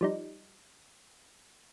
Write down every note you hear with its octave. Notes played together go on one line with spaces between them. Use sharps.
F3 G3 D#4